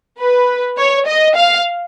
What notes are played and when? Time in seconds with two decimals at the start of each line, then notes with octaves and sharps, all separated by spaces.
0.19 B4
0.77 C#5
1.07 D#5
1.35 F5